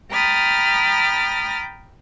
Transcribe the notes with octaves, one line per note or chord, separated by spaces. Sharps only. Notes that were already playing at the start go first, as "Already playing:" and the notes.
G5 A#5 B5 D#6 F6 A6